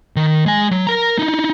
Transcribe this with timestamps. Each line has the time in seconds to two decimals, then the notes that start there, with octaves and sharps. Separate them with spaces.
0.16 D#3
0.46 G#3 G#5
0.71 F#3
0.87 A#4 A#5
1.19 D#4 E4